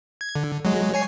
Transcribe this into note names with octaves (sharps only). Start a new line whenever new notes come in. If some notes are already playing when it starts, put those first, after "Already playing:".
G#6
D3
F#3 G#3
C#5 G#5 C7